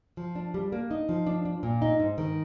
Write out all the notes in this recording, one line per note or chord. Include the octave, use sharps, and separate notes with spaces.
F3
D4
G3
A#3
D#4
F3
D4
D4
A#2
D#4
G#2
D#3